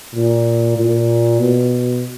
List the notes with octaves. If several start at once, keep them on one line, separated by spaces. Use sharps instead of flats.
A#2
A#2
B2